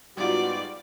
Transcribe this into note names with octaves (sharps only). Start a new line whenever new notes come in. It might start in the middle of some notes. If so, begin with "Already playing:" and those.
G#2 G3 B3 D#4 F4 F#4 D5